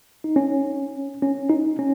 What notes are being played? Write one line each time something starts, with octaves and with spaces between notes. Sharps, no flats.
D#4
C#4
C#4
D#4
C#4